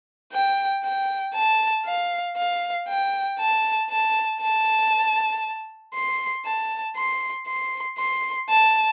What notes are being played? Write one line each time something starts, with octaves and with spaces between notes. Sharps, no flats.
G5
G5
A5
F5
F5
G5
A5
A5
A5
C6
A5
C6
C6
C6
A5